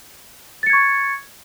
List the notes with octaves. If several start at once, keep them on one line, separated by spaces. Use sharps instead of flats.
C#6 G#6 A6 C#7